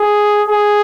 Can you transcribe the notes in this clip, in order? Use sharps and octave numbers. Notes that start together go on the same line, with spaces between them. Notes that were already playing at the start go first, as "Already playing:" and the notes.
Already playing: G#4
G#4